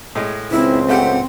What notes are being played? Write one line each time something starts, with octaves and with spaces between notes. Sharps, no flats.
A2 G#3
C#2 C4 E4
A3 G4 F#5